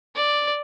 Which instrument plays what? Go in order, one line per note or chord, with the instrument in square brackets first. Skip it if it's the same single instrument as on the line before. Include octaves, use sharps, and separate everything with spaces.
[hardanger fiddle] D5